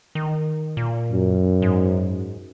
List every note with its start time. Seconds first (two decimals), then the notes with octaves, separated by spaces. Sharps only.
0.15 D#3
0.77 A#2
1.12 F#2
1.62 G#2